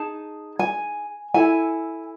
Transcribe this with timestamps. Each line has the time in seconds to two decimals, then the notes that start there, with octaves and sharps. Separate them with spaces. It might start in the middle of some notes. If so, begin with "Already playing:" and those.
Already playing: D#4 G#4 A5
0.59 G#5
1.34 E4 A4 G#5